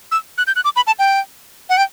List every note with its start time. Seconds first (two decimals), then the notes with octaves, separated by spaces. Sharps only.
0.12 E6
0.38 F#6
0.47 G6
0.56 F#6
0.64 D6
0.76 B5
0.87 A5
0.99 G5
1.69 F#5
1.77 G5